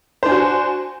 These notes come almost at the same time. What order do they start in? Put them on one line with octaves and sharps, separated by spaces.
C5 D4 G#5 F#4